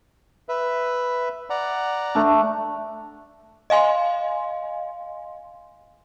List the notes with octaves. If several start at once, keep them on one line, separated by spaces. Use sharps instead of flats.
B4 E5
D5 F#5 A#5
A3 D4
D#5 F5 G#5 C6